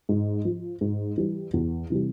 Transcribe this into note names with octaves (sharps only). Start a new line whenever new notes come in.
G#2
F3
G#2
E3 G3
E2
C3 E3 G3